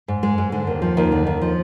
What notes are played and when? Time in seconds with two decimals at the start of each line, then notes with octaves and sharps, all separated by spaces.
0.08 G#2
0.23 G#3
0.38 G#2
0.52 D3
0.67 D#2
0.82 F3
0.97 D#2
1.12 D3
1.27 D#2
1.42 F3